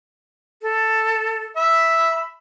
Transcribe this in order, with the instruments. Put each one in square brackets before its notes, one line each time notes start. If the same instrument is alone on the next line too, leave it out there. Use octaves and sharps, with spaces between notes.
[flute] A4
[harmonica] E5 [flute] B5